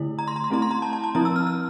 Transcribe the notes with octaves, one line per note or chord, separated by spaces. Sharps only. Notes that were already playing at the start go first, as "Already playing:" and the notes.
Already playing: D3 A3 E4
A#5
C6
A#5
C6
A3 C4 E4 A#5
C6
A#5
A5
A5
A5
F3 C4 E4 A#5
E6
F6
F6